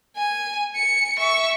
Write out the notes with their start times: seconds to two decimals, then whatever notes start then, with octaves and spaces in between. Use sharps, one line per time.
0.17 G#5
0.76 C#7
1.18 E5 C#6